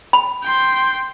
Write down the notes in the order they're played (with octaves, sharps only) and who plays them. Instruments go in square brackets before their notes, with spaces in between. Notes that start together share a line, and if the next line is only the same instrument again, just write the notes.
[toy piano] B5
[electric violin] G5 C6